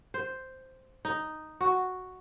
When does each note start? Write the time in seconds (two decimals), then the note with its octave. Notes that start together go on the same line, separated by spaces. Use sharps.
0.14 C5
1.05 D#4
1.61 F#4